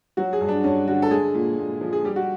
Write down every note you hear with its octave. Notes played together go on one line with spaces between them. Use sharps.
F#3 F#4
G#4
G2
D4
G2 C#4
D3 F#4
A4
G#3 G#4
A#2
A#2
F3
G#4
G3 G4
F#4